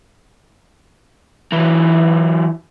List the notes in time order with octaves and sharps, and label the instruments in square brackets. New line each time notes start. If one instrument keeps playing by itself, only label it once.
[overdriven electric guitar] E3 F#3